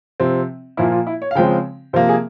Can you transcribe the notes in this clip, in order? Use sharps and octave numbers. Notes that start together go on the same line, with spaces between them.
C3 F3 C4
A#2 F3 A#3 E4
F4
E4
C#5
F5
C#3 F3 G#3 C4 G5
C3 F3 A#3 C5
G#4